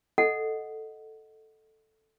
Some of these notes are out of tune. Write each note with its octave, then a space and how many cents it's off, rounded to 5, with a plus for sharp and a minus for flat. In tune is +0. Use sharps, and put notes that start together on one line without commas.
A4 +0 D#5 +0 F#5 +0